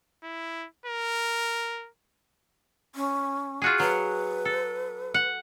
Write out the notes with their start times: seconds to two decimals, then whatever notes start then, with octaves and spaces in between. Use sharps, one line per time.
0.23 E4
0.86 A#4
2.95 C#4
3.62 F4 F#4 G#4
3.80 F#3 B4
4.45 A4
5.14 F#5